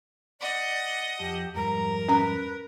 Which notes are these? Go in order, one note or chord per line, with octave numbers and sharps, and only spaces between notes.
D5 D#5 F#5
F2 G4 A5
F2 G#2 G3 A#4 A#5
C#4 B4 A#5